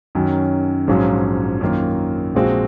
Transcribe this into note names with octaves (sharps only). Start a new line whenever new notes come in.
F#2 D#3 F#3 C#4
A#1 G#2 F#3 C#4 F4
F#2 D#3 A#3 F4
A#1 A#2 G#3 C4 F#4